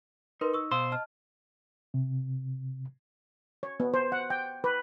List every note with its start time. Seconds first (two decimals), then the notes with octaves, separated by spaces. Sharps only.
0.41 D#4 A#4 B4 C6
0.53 C#6 E6
0.72 B2 C5 F5 C6 D#6 E6
0.92 D#5 A5 F6
1.94 C3
3.63 C#5
3.80 B3
3.94 C5
4.12 F#5
4.30 G5
4.64 B4